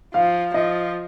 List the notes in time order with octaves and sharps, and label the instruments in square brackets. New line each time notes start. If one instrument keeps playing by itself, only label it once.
[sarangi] F3 [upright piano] F5
[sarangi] F3 [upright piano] D#5